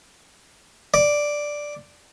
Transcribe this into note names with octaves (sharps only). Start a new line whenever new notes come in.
D5